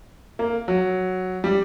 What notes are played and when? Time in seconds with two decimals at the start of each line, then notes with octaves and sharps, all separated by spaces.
0.39 A#3
0.68 F#3
1.44 G3